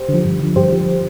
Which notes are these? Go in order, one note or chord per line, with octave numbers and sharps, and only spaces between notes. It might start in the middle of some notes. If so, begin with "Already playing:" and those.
Already playing: G4 C5
D3
F3
G2
D3 F3
G2 G4 C5
D3 F3